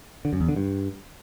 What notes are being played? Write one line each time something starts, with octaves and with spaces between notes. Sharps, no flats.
D3
F#2
E2
D3
G2